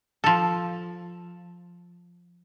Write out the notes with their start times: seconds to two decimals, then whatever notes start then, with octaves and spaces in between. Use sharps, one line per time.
0.24 F3 A4